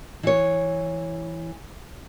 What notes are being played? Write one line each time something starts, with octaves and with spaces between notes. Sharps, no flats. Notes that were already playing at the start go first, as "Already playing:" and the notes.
E3 C#5